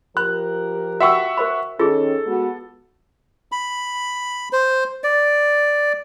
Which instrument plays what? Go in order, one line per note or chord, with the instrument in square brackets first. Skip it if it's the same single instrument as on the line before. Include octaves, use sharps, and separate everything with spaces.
[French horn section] F3 G4 A#4 [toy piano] B5 [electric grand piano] F#6
[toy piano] F#4 G5 E6 [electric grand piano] E5 F#5 C#6
[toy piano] A#4 C5 B5
[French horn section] D#3 C#4 [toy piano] F4 G#4 [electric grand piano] A4
[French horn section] G#3 B3 F#4
[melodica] B5
C5
D5